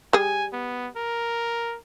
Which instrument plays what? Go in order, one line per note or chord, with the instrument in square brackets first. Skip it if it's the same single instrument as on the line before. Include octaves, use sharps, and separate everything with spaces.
[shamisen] G3 G#4 [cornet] G#5
[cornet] B3
A#4